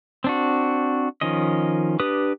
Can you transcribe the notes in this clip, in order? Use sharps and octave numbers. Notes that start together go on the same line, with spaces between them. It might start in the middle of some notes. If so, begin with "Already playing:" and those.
C4 D4 F#4
D#3 F3 C#4 D#5
D4 G4 B4 D#6